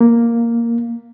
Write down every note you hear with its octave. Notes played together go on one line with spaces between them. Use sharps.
A#3